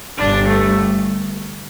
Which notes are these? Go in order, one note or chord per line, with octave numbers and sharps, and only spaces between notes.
G1 G2 D4
A3